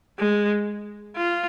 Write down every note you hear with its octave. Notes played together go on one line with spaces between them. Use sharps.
G#3
F4